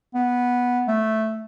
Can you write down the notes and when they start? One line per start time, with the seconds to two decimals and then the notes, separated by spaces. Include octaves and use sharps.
0.15 B3
0.88 A3